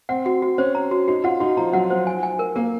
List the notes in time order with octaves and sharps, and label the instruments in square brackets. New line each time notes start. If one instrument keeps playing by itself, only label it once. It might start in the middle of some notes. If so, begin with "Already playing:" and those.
[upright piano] C4 [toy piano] F#5
[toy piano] F#4
F#4
[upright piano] C#4 [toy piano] C5
[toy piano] A#5
F#4
[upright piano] D#4 [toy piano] F#4
[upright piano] F4 [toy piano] F#5
[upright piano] D#4 [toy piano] F#4
[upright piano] F3 [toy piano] A#5
[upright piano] F#3 [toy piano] F#5
[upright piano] F#3 [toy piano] C5
[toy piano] G#5
G#5
A#4
[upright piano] A#3 [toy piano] A#4